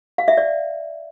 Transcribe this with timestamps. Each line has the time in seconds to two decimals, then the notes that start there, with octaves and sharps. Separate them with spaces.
0.18 F5
0.28 E5
0.37 D5